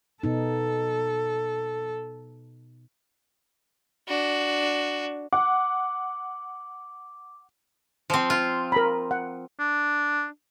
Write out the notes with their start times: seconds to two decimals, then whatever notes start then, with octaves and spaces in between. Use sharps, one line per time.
0.23 B2 B3 D#4 A4
4.08 D4 F#4
5.33 F#5 D6
8.10 F3 C4
8.30 F4
8.72 A#4 A#5 B5
9.11 F#5
9.60 D4